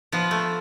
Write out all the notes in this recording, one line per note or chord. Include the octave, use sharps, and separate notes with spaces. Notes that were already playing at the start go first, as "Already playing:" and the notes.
F3 B3
A3